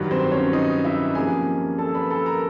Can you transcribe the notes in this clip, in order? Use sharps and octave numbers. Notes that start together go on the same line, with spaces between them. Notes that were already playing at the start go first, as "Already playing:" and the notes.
Already playing: G2 D#3 F#3
C4 C5
C#4 C#5
D#4 D#5
E4 E5
C3 F3 A#3 C#4 G#4 G#5
A4 A5
B4 B5
A4 A5
A#4 A#5